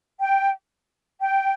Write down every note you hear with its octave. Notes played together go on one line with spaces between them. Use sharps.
G5
G5